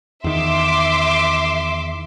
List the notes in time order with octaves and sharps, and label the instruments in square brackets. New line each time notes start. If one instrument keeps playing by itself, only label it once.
[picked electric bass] E2 D#3 [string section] E5 C6 D6